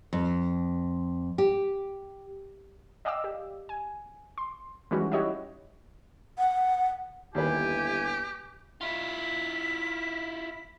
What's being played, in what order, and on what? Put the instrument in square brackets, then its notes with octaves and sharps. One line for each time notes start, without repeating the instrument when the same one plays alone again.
[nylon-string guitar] F2
G4
[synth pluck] D5 D#5 F5 G5 D6 E6
G4
G#5
C6
E3 G3 G#3 C#4 D#4 F#4
E4 F#4 G4 C#5 D#5 E5
[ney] F#5
[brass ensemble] G1 E4 G#5 [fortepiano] D#2 B4 [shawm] G4
[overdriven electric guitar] E4 F4 [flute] B6